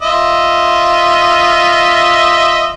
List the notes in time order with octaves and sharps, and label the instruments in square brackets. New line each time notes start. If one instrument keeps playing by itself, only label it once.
[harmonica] F4 D#5 E5